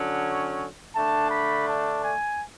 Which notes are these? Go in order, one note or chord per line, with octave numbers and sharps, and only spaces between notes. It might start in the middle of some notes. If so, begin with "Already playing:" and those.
Already playing: D3 F#3 C#4
D3 A3 D4 A5
B5
A5
G#5